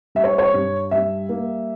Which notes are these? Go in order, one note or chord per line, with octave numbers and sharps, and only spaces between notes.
G3 E5
C#5
C#5
G2
G3 E5
A#3